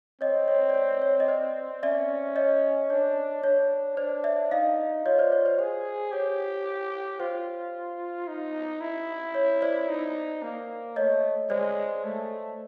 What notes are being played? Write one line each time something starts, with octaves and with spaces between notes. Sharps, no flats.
C4 C#5 D#5
C#5
D5
C#5
C#5
D#5
C5 D5
C#4 D5 E5
C#5 D#5
D4 C#5
D4 C#5
D4 C5 D5
D5 E5
D#4 D#5 F5
F4 C#5 D#5
C5 D5
C#5
C5
G#4 C5
G4 C#5
F4 C5
D#4
E4
C#5
C5 D5
D#4
A#3
A3 C#5 D#5
G#3 C5 D5
A3